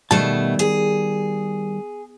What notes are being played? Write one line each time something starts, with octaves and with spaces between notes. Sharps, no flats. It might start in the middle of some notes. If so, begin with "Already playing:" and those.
B2 D#3 G3 A3 A5
G#4